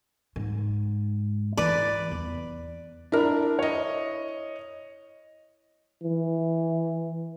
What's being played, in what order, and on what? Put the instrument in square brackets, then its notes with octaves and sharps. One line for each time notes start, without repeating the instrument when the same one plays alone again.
[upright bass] G#2
[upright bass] E3 E4 [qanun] B4 D5
[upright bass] E2
[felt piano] D4 A#4 [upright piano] E4
[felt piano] C#5 D#5
[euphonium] E3